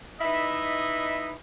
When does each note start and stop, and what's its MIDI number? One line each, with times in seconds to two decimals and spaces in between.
0.21 1.30 63
0.21 1.30 64
0.21 1.30 71
0.21 1.30 75
0.21 1.30 76